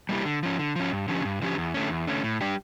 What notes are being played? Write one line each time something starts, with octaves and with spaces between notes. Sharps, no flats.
G3 A#3 E4 G4
D3
F3 C#4
D3
F3 C#4
G2
D3 F3 C#4 G4
G2
D3 F3 C#4 G4
E2
D3 A3 C#4
E2
D3 A3 C#4
A2
G3 D4 G4